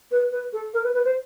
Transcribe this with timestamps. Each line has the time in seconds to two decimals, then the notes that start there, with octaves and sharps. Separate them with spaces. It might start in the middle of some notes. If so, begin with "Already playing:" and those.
0.11 B4
0.31 B4
0.52 A4
0.73 A#4
0.83 B4
0.94 B4
1.04 C5